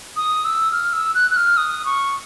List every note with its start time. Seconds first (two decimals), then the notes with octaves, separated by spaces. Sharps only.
0.16 D#6
0.45 E6
0.72 F6
0.93 E6
1.15 F#6
1.31 F#6
1.37 F6
1.57 D#6
1.85 C#6